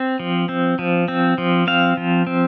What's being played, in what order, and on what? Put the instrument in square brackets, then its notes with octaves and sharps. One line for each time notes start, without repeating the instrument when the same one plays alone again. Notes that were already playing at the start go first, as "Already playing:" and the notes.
Already playing: [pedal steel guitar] C4
F3
C4
F3
C4
F3
C4 F5
F3
C4